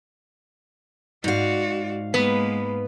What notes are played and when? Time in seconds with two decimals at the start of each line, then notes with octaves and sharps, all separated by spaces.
1.24 G#2 F#4 D5 F5
2.14 G#3 A#3 B3 B4